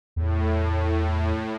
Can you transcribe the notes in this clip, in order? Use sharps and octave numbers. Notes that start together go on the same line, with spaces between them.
E2 A2